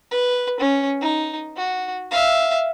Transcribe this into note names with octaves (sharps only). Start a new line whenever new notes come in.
B4
C#4
D#4
F#4
E5 F5